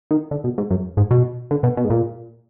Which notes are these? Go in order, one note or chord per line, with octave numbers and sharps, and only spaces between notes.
D#3
D3
B2
G#2
F#2
G#2
B2
D3
B2
B2
G#2
A#2